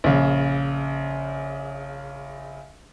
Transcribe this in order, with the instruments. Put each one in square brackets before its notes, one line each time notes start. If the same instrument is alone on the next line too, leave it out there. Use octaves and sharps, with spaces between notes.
[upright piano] A#1 C#3